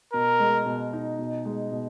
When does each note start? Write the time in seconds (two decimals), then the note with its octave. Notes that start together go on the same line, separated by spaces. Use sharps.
0.13 B2 A#4
0.40 G#3
0.66 B2
0.93 D#4
1.19 B2
1.45 G#3
1.72 B2